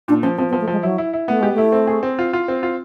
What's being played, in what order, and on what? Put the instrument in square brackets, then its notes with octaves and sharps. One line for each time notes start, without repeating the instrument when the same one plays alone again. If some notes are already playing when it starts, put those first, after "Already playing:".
[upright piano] A#2 [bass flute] D4
[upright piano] F3 [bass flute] C#4
[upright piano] F3 [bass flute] C4
[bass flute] B3
[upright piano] F3
[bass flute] A3
[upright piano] F3 [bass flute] G#3
[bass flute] F#3 [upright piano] E4
[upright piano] E4
E4
[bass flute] A3 [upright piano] B3
[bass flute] G#3 [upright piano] G4
[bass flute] A3 [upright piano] E4
[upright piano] C4
G#4
C4
F4
F4
C4
F4